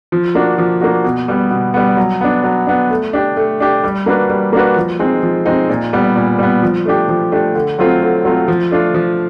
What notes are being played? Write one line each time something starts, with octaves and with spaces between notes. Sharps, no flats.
F3
A#3 D4 F#4
F3
A#3 D4 F#4
B2
G3 B3
B2
G3 B3
F#3
B3 D4
F#3
B3 D4
A3
D4 G4
A3
D4 G4
G3
A#3 D4 F#4 B4
G3
A#3 D4 F#4 B4
F3
G#3 C4 D#4
F3
G#3 C4 D#4
A#2
G3 B3
A#2
G3 B3
F3
A3 D4 G4
F3
A3 D4 G4
D3
F#3 A3 C4 F4
D3
F#3 A3 C4 F4
F3
A3 D4 F4
F3